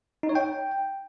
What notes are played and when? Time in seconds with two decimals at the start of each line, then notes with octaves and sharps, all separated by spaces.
0.23 D#4
0.29 C#5
0.35 G5